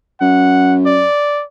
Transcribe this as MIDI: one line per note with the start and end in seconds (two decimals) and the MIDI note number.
0.21 1.04 42
0.21 0.77 78
0.86 1.44 74